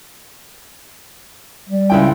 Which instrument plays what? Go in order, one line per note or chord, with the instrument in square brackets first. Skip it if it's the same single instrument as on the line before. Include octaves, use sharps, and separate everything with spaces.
[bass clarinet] G3
[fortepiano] C#2 E4 G5